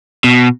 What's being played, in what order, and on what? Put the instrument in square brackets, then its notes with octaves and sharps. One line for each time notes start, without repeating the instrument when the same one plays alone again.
[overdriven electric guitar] B2